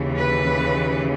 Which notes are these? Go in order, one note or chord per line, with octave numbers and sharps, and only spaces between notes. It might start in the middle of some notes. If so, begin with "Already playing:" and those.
Already playing: D#2 C#3 E3
B4